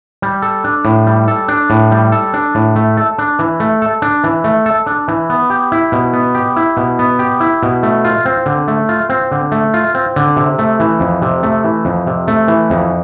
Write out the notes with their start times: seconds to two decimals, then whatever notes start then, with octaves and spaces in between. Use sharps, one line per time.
0.22 G3
0.42 A4
0.64 D4
0.85 A2
1.07 G3
1.28 A4
1.48 D4
1.70 A2
1.91 G3
2.12 A4
2.34 D4
2.55 A2
2.76 A3
2.97 A4
3.18 D4
3.39 E3
3.60 A3
3.82 A4
4.02 D4
4.24 E3
4.44 A3
4.66 A4
4.86 D4
5.08 E3
5.30 B3
5.50 G4
5.72 E4
5.92 B2
6.13 B3
6.35 G4
6.56 E4
6.77 B2
6.99 B3
7.19 G4
7.40 E4
7.63 B2
7.83 A3
8.05 F4
8.25 C4
8.46 D3
8.68 A3
8.89 F4
9.09 C4
9.32 D3
9.52 A3
9.74 F4
9.94 C4
10.16 D3
10.36 C3
10.59 A3
10.80 E3
11.00 F2
11.22 C3
11.43 A3
11.64 E3
11.85 F2
12.07 C3
12.28 A3
12.48 E3
12.70 F2